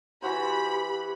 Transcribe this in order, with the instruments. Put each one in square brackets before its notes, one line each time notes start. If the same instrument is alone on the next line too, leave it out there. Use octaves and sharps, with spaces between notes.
[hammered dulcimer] E3 F#4 C5 [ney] G4 [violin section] B5